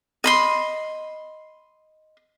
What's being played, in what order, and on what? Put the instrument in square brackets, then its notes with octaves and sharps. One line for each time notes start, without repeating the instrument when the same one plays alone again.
[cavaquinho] D#5 B5 C6